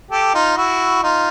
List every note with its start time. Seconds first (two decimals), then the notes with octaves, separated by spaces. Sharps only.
0.11 G4 A4
0.34 D#4 F4
0.57 E4 F#4
1.03 D#4 F4